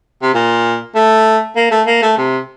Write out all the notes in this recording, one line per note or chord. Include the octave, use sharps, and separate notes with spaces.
C3
A#2
A3
A#3
A3
A#3
A3
C3